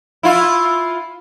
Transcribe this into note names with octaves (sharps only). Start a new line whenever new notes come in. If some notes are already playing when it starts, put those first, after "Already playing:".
E4 F4